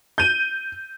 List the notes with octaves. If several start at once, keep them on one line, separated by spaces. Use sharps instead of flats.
G6 D#7